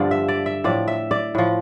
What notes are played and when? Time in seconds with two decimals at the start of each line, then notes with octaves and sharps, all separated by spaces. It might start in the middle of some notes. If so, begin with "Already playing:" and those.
Already playing: G2 D3 F3 D5
0.11 E5
0.28 D5
0.46 E5
0.64 A2 F3 D5
0.88 E5
1.11 D5
1.35 A2 F3